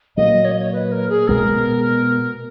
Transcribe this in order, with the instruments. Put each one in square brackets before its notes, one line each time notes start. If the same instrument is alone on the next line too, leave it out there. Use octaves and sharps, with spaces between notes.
[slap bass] A#2 F#3 A#3 [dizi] D#5
[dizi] C#5
D#5
C#5
B4
A#4
G#4
[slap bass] B2 G#3 B3 [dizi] A#4